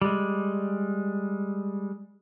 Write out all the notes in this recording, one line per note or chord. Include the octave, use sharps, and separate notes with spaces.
G3 G#3